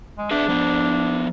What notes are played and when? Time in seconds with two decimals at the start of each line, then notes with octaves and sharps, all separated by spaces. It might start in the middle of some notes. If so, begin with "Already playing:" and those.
0.18 G#3
0.31 D4 G#4 B4 E5
0.48 F3 B3 C5